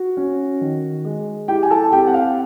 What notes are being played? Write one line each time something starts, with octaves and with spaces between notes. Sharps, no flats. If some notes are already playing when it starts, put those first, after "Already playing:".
Already playing: F#4
C#4
D#3
G#3
E4 G4 G5
G#5
A4 A5
C4 G4 G5
F#5
F5